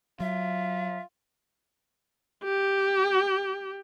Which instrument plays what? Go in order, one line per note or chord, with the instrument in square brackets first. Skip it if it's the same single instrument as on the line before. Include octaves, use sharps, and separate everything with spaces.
[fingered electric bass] F#3 [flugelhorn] F4 [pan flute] E5
[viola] G4